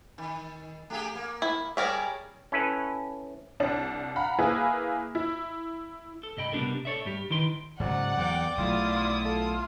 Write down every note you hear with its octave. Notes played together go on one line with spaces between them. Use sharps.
D#3
A3 G4 G#4
A#3
E4
G3 G#4 A#4 C#5 D5 E5
C#4 E4 A4 B4
C2 D4
F5 F#5 A#5 B5
A#3 E4 G#4 B4
E4
A4
C2 G2 D#5 G5 B5
C3 G3 B3 D4 A4 A#4
A4 C#5 D5 E5
G2 G3 G4
D#3 E4 B4 G5 C6
G#2 C#3 F#3 D5 F#5
E2 F#3 G5 D6
B1 F#3 A3 E4 F4 D#6
F4 A4